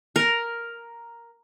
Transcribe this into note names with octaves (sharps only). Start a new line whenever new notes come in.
A#4